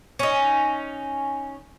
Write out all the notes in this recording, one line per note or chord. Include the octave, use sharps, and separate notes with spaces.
C#4 D#4